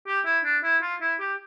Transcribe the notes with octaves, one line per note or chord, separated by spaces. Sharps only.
G4
E4
D4
E4
F4
E4
G4